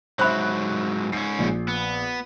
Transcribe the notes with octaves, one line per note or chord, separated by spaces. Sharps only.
G#2 F#3 C5 E5 B5 F#6
G#2 C#4 C7
A#1
B3